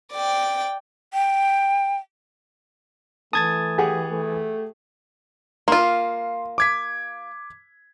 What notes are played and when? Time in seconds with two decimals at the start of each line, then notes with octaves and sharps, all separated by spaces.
0.13 D5 G5
1.13 G5
3.33 E3 A3 A5 D#6 G#6 A6
3.78 G4 G#4 F#5
4.10 A3
5.68 A#3 F4 C6
6.58 D6 G#6 B6